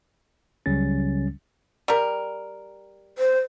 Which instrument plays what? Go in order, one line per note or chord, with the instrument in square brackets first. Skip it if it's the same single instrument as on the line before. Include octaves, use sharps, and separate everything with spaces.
[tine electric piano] C#2 C#3 F#3 G3 C#4 A6
[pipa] G3 A#4
[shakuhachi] C5